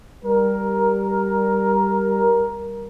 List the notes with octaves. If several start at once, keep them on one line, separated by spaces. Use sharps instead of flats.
G3 A#4